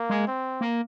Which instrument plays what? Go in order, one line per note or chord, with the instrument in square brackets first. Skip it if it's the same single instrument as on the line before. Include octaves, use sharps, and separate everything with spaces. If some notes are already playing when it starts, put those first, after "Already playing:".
Already playing: [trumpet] A#3
[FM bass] G#3
[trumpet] C4
[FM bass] A#3